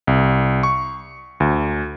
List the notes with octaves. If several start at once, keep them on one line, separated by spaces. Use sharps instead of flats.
C2
C#6
D2